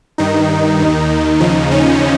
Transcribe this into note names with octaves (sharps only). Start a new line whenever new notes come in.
G2 D#3 D#4
D#2 D#3
D#2 C#3 F3 D#4
C#4